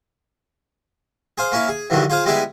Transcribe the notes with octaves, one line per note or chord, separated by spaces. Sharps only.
G#4 C5 F5
A#3 C#4 E4 F5
G#4
E2 G2 D3 D#3 F#3
F4 G#4 C5 F5
G3 G#3 B3 E4 G#4 D5